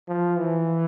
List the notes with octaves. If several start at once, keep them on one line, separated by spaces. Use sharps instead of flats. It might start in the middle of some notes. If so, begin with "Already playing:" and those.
F3
E3